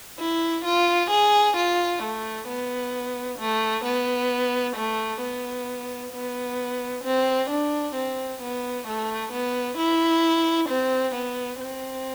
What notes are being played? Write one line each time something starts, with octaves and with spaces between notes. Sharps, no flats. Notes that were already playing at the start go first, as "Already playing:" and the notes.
E4
F4
G#4
F4
A3
B3
A3
B3
A3
B3
B3
C4
D4
C4
B3
A3
B3
E4
C4
B3
C4